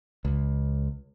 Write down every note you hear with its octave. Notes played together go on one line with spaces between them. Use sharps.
C#2